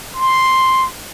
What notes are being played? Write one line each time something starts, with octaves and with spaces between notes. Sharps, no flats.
C6